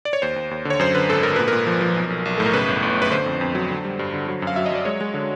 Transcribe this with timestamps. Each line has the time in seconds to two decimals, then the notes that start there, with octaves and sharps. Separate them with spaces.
0.05 D5
0.13 C#5
0.22 D#2 C5
0.36 D#2
0.51 D#2
0.65 D3
0.70 C#5
0.79 F#2 C5
0.95 D3 B4
1.09 G#1 A4
1.23 G#1 A#4
1.36 A#2 B4
1.48 A#4
1.53 A#2
1.67 F3
1.81 F3
1.96 B1
2.10 B1
2.25 B1
2.38 A2 A4
2.46 A#4
2.53 C#3 B4
2.68 G1
2.83 G1
2.97 F#2 B4
3.11 D3 C5
3.26 F2
3.41 F2
3.55 F#3
3.70 D3
3.84 G3
3.99 G2
4.14 D3
4.28 F#3
4.42 F#2
4.47 F5
4.56 F#3 E5
4.66 D#5
4.71 F#3 D5
4.85 G#3 C#5
5.01 G#3
5.14 D3